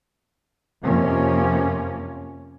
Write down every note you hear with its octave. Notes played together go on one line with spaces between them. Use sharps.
F2 C3 F3 A#3 C#4